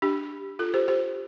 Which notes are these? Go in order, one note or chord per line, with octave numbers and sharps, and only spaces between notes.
D4 G4
F4 A4
G4 C5
G4 C5